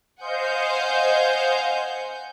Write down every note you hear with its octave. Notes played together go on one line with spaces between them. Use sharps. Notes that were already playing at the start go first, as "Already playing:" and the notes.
C5 D#5 F5 F#5 G#5 G6